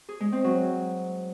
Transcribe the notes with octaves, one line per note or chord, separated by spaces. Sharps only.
G#4
G#3
C4
F#3